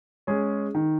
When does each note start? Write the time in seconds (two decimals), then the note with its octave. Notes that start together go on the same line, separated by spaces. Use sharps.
0.27 G#3 C#4 G#4
0.75 D#3